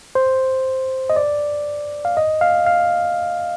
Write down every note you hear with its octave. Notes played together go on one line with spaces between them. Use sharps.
C5
D#5
D5
F5
D#5
F5
F5